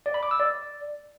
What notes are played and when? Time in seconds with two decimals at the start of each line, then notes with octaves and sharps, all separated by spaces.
0.06 D5
0.14 B5
0.23 D6
0.31 E6
0.40 D5